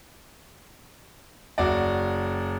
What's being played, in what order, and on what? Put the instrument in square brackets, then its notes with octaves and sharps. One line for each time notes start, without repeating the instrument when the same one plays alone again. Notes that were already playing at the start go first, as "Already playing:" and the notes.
[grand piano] F#1 F#4 D5